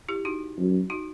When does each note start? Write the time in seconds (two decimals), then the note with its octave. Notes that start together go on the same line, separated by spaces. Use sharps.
0.09 E4 G4
0.25 D#4 F#4
0.58 F#2
0.90 D#4 F#4